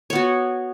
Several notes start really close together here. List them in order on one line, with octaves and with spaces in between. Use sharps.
C#5 B3 F#4